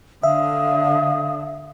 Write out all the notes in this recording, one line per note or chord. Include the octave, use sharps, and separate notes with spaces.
D3 E5 F5 D#6